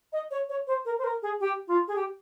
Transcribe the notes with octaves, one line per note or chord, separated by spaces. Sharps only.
D#5
C#5
C#5
C5
A#4
C5
A#4
G#4
G4
F4
G#4
G4